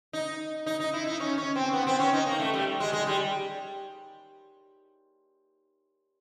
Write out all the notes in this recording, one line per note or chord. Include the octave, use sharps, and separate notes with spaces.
D#4
D#4
D#4
E4
D#4
C#4
C#4
C4
B3
C4
C#4
D#4
A#3
A3
G3
G#3
G#3
G3